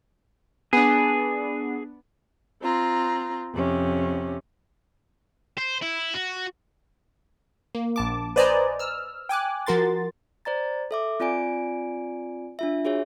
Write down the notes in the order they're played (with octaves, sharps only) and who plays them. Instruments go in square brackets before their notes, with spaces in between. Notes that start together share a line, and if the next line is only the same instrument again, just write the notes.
[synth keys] B3 D4 [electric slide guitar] G#4
[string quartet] C4 F4 A#5
F2 C3 C#4
[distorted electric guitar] C5
E4
F#4
[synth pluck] A#3
A#1 A5 D6
B4 C5 D5 D#5 G#5 A#5
E6 F6
G5 G#5 D6 F#6
F3 F#4 A#4 C6 A6
[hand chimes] C5 D5 A#5 A6
A4 E5 D6
C4 F4 D5 G#5 D7
D4 F4 E5
F#4 G#4 C#5 E5